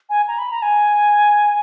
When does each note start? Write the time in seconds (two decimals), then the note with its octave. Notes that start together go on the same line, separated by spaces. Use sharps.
0.10 G#5
0.28 A#5
0.38 B5
0.51 A#5
0.62 G#5